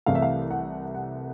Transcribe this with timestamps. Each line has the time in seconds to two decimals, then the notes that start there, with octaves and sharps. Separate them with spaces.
0.06 C2 C3 E3 A3 F5
0.15 E5
0.22 F5
0.51 F#5
0.94 F#5